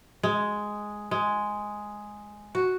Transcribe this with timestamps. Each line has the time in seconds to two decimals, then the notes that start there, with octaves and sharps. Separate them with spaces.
0.23 G#3
1.11 G#3
2.55 F#4